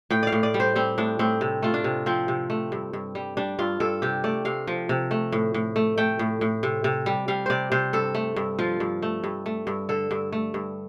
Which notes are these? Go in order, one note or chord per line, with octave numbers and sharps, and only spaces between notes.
A2 G5
D5 F5
A2
D5
G3
C5
G3 C4
A2 D4
A2 C4
C3
A3 F4
D4
C3
F3 C4
C3
A3
G2
G2
G3
G3 D4
G2 F4
G2 A4
C3 G4
A3 D5
C3 F5
F3
C3
A3
A2
A2
A3
A3 G5
A2
A2
C3
C3
G3
G3 F5
C3 C5 D5
C3 C5
G2 A4
A3
G2
F3 F4
G2
A3
G2
A3
G2
D3 A4
G2
A3
G2